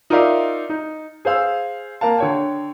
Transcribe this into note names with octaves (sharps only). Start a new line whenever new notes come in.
D#4 F4 A#4 D5 E5 F5
D#4
G#4 C5 F5 E6
A#3 A#4 F5 A5
D3 C#5 G5